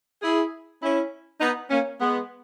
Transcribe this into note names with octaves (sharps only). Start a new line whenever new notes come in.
E4 G#4
C#4 E4
B3 D#4
A#3 C#4
G#3 B3